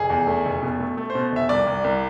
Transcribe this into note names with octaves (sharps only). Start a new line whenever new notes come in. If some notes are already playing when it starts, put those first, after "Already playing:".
Already playing: F1 G#4
E2
A3
F1
B2
A3
A3
C5
B2
F1 E5
C2 D5
C2
C2